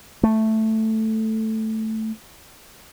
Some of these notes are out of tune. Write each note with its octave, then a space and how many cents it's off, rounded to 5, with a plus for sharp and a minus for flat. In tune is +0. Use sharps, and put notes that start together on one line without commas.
A3 +0